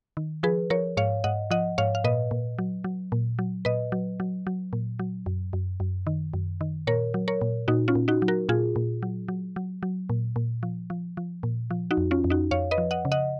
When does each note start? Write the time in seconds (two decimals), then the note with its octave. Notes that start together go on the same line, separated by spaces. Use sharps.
0.17 D#3
0.43 F3 G#4 B4
0.70 F3 A#4 C#5
0.97 G#2 C#5 F5
1.24 G#2 D#5 F#5
1.51 F3 D#5 F#5
1.78 G#2 C#5 F5
1.95 F5
2.04 A#2 B4 D#5
2.31 A#2
2.59 F#3
2.84 F#3
3.12 A#2
3.39 F#3
3.65 A#2 B4 D#5
3.92 F#3
4.20 F#3
4.47 F#3
4.73 A#2
4.99 F#3
5.26 F#2
5.53 F#2
5.80 F#2
6.07 D#3
6.34 F#2
6.61 D#3
6.87 A#2 A#4 C#5
7.14 F#3
7.28 A#4 C#5
7.41 A#2
7.68 A#2 D#4 F#4
7.88 C#4 F4
7.95 A#2
8.08 D#4 F#4
8.22 F#3
8.28 F#4 A#4
8.49 A#2 F4 G#4
8.76 A#2
9.03 F#3
9.28 F#3
9.56 F#3
9.83 F#3
10.10 A#2
10.36 A#2
10.63 F3
10.90 F3
11.17 F3
11.43 A#2
11.71 F3
11.91 D#4 F#4
11.97 F2
12.11 C#4 F4
12.24 F2
12.30 D#4 F#4
12.51 F2 C#5 F5
12.71 B4 D#5
12.78 F3
12.91 D#5 F#5
13.05 C#3
13.12 D#5 F#5